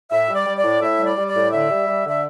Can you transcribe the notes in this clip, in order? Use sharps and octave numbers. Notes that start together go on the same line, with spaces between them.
A2 E5
G3
D5
G3
D5
A2
A2 E5
G3
D5
G3
D5
A2
D3 E5
G3
G3
D3 E5